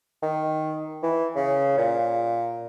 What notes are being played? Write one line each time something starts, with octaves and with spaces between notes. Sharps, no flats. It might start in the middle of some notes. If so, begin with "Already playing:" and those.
D#3
E3
C#3
A#2